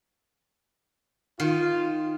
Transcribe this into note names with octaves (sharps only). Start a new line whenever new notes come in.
D#3 F4